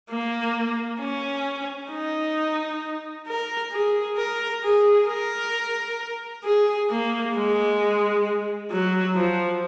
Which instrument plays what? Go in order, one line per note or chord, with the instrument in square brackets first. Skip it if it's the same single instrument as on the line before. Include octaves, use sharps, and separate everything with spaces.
[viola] A#3
C#4
D#4
A#4
G#4
A#4
G#4
A#4
G#4
A#3
G#3
F#3
F3